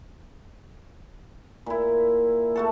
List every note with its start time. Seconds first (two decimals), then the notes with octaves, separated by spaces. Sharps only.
1.66 A#2 E4
2.56 A3 F#4 A4